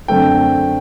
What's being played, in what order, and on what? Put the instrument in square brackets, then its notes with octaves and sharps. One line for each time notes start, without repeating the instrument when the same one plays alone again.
[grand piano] F#2 D3 A3 C4 G5